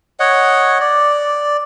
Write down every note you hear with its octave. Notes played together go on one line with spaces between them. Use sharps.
C#5 D#5 F#5
D5